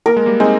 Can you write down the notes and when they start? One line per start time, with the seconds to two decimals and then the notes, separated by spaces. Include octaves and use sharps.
0.06 A#3 A#4
0.17 G#3
0.26 G3 A#3
0.40 G#3 C4 D#4